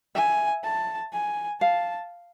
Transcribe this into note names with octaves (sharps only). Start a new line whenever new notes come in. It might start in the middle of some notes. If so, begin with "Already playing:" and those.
E5 G#5
A5
G#5
F5 A5